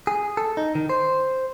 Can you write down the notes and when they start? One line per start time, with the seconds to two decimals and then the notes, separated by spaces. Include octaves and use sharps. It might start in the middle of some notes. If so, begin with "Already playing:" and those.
0.07 G#4
0.37 A4
0.57 D#4
0.75 D#3
0.89 C5